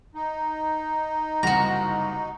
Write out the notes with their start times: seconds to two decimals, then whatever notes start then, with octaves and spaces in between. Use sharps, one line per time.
0.15 D#4
1.43 F#1 C2 F#4 F#5 A#5